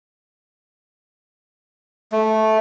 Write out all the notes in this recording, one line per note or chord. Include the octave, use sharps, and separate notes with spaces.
A3